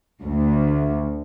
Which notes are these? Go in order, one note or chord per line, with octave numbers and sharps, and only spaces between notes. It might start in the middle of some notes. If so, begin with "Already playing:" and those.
D2